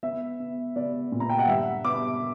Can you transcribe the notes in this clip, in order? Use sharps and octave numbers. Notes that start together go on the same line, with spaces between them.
B3 E5
B3
B3 D5
A#2
A#5
G5
F#5
G2 E5
B3 D6